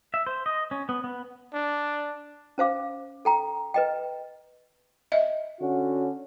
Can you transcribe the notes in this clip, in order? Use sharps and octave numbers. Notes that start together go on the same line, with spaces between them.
E5
C5
D#5
C#4
B3
B3
D4
C#4 C5 F5 D6
A4 G5 A#5
B4 D#5 G5
D#5 E5
D3 C#4 F#4